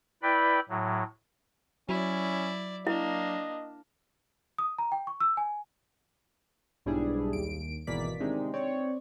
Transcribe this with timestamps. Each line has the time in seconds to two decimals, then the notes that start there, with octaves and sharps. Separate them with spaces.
0.22 E4 B4 D5 G5 B5
0.69 A2 F#3
1.89 F#3 C#4 E4 D5
2.87 A#3 D4 E4 D#5
4.58 D#6
4.78 A#5
4.92 G5
5.07 C#6
5.20 E6
5.37 G#5
6.86 B1 G#2 G3 D4 E4 G#4
7.33 D#2 D7
7.87 G#1 B2 E3 A#3 D5 B6
8.20 C3 D#3 G#3 D4 D#4
8.54 C4 C#5 D5